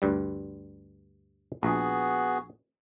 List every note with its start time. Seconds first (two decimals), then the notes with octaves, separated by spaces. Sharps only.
0.02 D2 G2 G3
1.63 A#1 B3 F#4 G#4